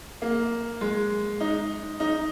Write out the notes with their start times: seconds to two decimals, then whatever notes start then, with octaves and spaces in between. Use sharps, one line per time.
0.22 A#3
0.81 G#3
1.40 D#4
2.00 D#4